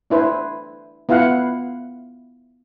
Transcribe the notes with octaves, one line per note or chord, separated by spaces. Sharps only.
D4 E4 B4 C5
B3 E4 F4 F5 F#5